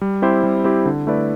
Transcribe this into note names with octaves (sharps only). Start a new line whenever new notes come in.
G3
C4 E4 G4 C5
G3
C4 E4 G4 C5
D3
A3 E4 B4 D5